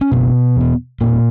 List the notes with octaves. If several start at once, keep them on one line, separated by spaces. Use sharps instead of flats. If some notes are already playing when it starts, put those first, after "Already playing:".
C#4
F#1 B2 B3
E2 B2
E1 A#2 A#3